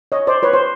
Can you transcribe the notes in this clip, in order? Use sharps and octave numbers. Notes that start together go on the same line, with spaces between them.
C#5 D#5
C5 D5
B4 C#5
C5